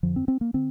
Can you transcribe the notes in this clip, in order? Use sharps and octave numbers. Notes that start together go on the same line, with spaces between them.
F2 D3 F3
C4
C4
A#3
D3 C4